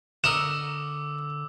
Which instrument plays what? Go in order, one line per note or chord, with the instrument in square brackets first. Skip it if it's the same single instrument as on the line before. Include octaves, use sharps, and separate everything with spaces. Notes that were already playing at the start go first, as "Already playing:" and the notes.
[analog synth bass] D3 [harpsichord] A#4 D#5 F#5 [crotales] D6 E6 [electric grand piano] E7